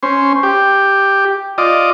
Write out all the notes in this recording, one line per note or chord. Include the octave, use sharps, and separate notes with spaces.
C#4 C5
G4
F4 D5 D#5